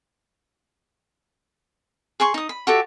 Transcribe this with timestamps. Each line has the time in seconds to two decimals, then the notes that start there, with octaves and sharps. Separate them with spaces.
2.20 G#4 G#5 C6 C#6
2.34 D#4 D#6
2.49 B5
2.67 F#4 G4 A4 E5